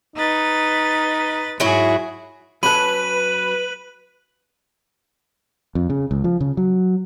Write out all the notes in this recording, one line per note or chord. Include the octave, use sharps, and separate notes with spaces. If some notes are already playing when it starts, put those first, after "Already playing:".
D#4 B4 A6
G#2 F#3 E4 F#4 G#4
F#3 C#4 A4 B4 B5 F#6 D#7 F#7
F2
C#3
C#2
F3
C#3
F#3